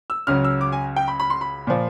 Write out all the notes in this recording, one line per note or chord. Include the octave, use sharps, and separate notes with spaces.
E6
C#2 C#3 F#3 F6
E6
D6
G#5
G5
B5
B5
C6
B5
A#2 F3